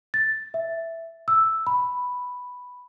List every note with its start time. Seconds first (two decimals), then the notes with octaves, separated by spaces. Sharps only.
0.14 A6
0.54 E5
1.28 E6
1.67 B5